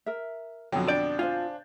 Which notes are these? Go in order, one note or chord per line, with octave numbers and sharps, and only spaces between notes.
A#4 E5
F2 B2 D3 F#3 G5
D4 D5 G6 A6
F4 C5 F5 G#5